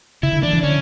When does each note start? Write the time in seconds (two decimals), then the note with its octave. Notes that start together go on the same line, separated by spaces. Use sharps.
0.23 C#3 E4
0.33 D3
0.43 E3 D4
0.53 E3
0.63 D3 C#4